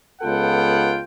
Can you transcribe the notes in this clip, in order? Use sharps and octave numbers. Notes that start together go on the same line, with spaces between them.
C#2 B3 F4 A4 F#5 G5